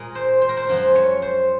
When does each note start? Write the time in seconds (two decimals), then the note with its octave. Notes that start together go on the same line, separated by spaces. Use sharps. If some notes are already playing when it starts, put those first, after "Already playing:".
Already playing: A#2 G#3 A#4
0.15 C5
0.41 C5
0.49 A#4
0.57 C5
0.69 F#2 F3 G#3 C5
0.95 C#5
1.22 C5